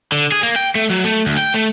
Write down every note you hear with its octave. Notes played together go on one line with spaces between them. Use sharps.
D3
G#4
A#3
G5
A3
F#3
A3
D2
G5
A3